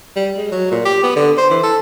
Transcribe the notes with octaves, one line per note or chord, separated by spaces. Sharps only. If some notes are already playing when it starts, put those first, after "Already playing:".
G3
G#3
F#3
A#2
G4
B3
D3
C5
E3
A4